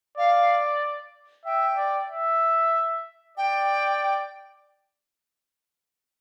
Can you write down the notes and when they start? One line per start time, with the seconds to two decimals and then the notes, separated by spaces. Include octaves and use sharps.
0.17 D5 F5
1.45 E5 G5
1.77 D5
2.09 E5
3.37 D5 G5